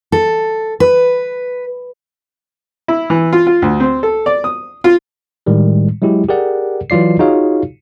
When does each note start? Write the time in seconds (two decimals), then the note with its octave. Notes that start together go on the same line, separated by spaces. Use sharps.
0.12 A4
0.80 B4
2.88 E4
3.10 E3
3.33 F4
3.47 F4
3.62 D2
3.80 C4
4.03 A4
4.26 D5
4.44 D#6
4.84 F4
5.46 A2 D#3 G3 G#3
6.02 F#3 G#3 E4 G4
6.29 G4 G#4 A#4 D5 F#5
6.90 E3 F#3 F4 D5 C7
7.19 D#4 F4 F#4 G#4 C#5 F5